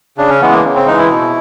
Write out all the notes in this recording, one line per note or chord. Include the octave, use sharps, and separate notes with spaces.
C#3 D4
C#4
E3 G#3 B3
A#3
C#3
C4
E3 G#3 D#4
E4
B2